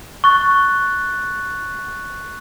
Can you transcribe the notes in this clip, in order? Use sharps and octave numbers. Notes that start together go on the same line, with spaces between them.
C#6 F#6 A6